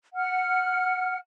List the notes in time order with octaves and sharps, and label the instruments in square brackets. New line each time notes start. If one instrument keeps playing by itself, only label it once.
[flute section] F#5 F6